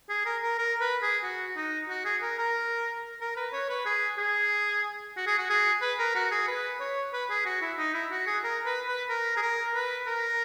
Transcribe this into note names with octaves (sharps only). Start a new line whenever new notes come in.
G#4
A#4
A#4
A#4
B4
G#4
F#4
D#4
F#4
G#4
A#4
A#4
A#4
B4
C#5
B4
G#4
G#4
F#4
G#4
F#4
G#4
B4
A#4
F#4
G#4
B4
C#5
B4
G#4
F#4
E4
D#4
E4
F#4
G#4
A#4
B4
B4
A#4
G#4
A#4
B4
A#4